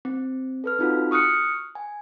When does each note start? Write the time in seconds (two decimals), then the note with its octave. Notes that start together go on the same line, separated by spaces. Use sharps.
0.05 C4
0.64 A4 B4 F6
0.79 C4 D#4 F4 F#4 A4
1.11 C#6 D#6 F6 F#6 C#7
1.75 G#5